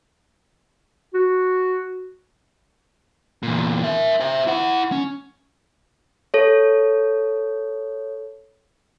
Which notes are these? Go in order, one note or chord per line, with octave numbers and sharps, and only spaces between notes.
F#4
E2 A#2
A#4 E5
C5 E5
E4 F#5
C#4
A4 C#5